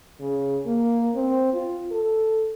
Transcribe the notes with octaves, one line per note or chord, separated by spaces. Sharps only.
C#3
A#3
C4
F4
A4